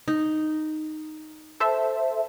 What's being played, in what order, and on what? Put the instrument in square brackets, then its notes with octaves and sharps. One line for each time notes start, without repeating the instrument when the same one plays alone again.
[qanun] D#4
[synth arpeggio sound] A4 C5 E5